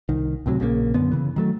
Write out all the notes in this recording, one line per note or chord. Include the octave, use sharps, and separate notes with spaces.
C2 D#3
C#2 A2 C3 F#3
A#1 C#3 E3 A#3
F#2 D3 B3
C#3 E3
D#3 F#3 A3